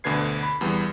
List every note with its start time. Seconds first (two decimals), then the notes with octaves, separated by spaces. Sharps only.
0.04 D2 B2 D3 B4 G#6 C7
0.43 B5
0.61 E2 G3 B3